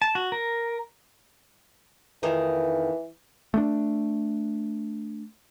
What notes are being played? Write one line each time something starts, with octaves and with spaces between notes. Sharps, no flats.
A5
F#4
A#4
F2 D#3 E3 D#4
A3 B3 D4